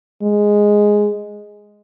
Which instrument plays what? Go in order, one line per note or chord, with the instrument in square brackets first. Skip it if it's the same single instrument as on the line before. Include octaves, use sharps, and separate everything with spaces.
[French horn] G#3